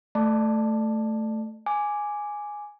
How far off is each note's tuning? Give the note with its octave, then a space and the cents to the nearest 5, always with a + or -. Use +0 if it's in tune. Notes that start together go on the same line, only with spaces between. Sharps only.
A3 +0 D5 +20 A5 +0
G#5 +0 D6 +0